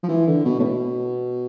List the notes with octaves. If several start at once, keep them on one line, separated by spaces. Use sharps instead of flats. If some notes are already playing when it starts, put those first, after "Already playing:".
F3
E3
D3
B2
A2
B2